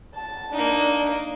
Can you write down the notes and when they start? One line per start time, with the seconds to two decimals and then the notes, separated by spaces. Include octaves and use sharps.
0.15 A5
0.53 A#3 D4 D#4